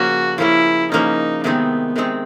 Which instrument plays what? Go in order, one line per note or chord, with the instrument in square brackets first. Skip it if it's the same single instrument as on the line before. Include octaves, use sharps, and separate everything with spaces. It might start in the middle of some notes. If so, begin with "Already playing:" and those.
Already playing: [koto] C#3 F3 A#3 C#4 [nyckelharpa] F#4
[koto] C#3 F3 A#3 C#4 [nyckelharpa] E4
[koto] C#3 F3 A#3 C#4 [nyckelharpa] D#4
[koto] C3 D#3 G#3 C4 D#4 [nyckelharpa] B3
[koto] C3 D#3 G#3 C4 D#4